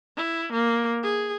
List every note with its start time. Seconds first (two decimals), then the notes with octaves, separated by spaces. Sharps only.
0.17 E4
0.53 A#3
1.03 G#4